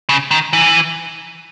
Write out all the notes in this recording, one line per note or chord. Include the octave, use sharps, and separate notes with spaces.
C#3
D#3
E3